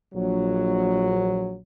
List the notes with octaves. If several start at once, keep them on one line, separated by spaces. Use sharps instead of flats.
A#1 F#3